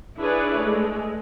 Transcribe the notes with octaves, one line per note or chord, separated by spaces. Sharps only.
D4 E4 G#4 B4 C#5 D5
G#3 A3